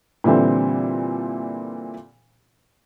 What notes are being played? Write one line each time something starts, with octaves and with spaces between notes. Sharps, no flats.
A#2 D3 E3 G3 C4